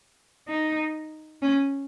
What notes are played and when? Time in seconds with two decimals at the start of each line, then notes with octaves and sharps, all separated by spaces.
0.48 D#4
1.42 C#4